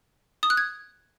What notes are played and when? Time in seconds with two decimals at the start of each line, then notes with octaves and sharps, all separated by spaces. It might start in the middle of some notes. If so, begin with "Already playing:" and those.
0.43 D#6
0.50 F#6
0.57 G#6